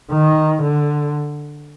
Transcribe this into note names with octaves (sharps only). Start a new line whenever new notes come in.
D#3
D3